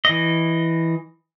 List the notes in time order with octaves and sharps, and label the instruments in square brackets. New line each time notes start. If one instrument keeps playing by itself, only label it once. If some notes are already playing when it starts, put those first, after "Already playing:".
[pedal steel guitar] E3 D#5